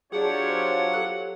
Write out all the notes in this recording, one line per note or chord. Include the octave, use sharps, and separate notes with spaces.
F#3 D4 F4 G4 G#4 C#5 D5 F#5
C5
G4 A4 F#6